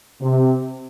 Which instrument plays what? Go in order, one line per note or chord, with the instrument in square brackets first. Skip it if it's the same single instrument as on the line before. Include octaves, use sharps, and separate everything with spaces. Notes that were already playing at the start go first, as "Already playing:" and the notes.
[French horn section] C3